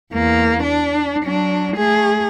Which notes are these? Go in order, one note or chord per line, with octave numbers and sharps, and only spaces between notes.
E2 A#3
D4
F#3 D4
A3 G#4